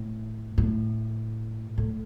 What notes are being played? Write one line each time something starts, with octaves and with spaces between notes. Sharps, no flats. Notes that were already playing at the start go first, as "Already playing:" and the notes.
Already playing: A2
A2
A2